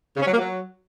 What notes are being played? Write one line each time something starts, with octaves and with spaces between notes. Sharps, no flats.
C#3
C#4
F#3
A#3
F#3